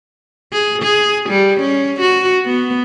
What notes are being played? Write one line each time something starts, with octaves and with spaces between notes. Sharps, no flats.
G#4
G#4
G3
C#4
F#4
B3